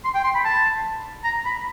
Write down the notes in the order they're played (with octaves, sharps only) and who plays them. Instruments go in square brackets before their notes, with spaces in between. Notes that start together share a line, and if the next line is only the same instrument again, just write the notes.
[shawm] C6
G5
C6
B5
A5
A#5
B5